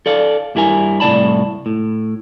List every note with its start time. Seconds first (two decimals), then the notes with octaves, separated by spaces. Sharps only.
0.06 A4 D5 F5
0.55 G2 G3 E4 A#4 G#5
1.00 C2 A2 D5 A5 B5
1.66 A2